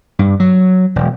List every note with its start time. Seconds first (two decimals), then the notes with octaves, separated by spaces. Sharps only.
0.19 G2
0.40 F#3
0.96 E1